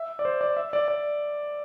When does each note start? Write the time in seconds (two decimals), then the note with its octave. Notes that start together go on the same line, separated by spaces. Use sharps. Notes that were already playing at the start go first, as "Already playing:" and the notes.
Already playing: E5
0.19 D5
0.25 C5
0.41 D5
0.57 E5
0.73 D5
0.88 D5